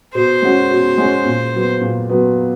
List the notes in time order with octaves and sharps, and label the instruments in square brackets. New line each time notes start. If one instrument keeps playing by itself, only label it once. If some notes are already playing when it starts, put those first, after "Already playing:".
[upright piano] B2 [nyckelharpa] C5
[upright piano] G#3 C#4 F#4
B2
G#3 C#4 F#4
A#2
F#3 B3
A#2
F#3 B3